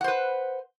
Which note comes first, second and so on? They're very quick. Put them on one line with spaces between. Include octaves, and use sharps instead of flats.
F#5 C5 B4